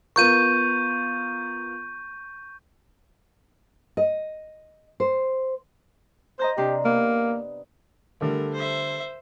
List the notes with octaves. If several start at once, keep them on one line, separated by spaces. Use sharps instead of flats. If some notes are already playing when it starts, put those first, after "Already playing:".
B3 F4 A#4 C#6 G6 D#7
D#5
C5
C5 D#5 A#5 G6
C3 D4 G4 C6
A#3 B3
D3 G3 A3 A#4
C5 E5